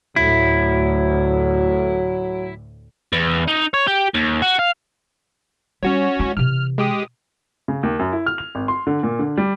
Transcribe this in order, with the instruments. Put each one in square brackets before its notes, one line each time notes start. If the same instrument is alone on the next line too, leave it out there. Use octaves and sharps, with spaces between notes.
[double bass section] D2 A2 [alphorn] F#3 [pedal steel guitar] E4
[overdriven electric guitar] E2
D#4
C#5
G4
D#2
F#4
F5
[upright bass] G3 [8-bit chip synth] C#4 F#4 C#5
[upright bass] G#3 E4
[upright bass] C3 E3 [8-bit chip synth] F6
[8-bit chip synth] G#3 G4 D#6
[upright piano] C#3
D#2
F#2
E4
F6
F7
G#1
C6
D3
A#2
D3
G3